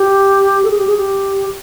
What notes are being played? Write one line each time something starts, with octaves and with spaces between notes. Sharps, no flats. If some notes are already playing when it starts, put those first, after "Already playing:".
Already playing: G4
A4
G#4
G4
G#4
G4